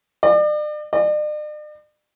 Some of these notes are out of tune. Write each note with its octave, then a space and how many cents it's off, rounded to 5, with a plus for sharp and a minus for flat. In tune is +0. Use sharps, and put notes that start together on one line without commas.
D5 +40
D5 +45